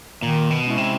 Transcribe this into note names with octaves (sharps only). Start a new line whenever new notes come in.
A#2 D#3
B2
G#3 C#4 E4
C3